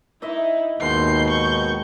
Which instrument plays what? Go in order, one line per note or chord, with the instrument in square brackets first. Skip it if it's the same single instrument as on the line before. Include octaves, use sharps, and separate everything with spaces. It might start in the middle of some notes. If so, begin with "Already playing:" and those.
[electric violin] D#4 E4 [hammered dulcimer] D#5 E5
[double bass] D#2 [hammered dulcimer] G#2 C6 [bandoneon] B2 D#3 [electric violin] G6 C7
[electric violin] C#6 G6